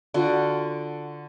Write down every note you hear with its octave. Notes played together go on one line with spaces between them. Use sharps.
D3 F4 F#4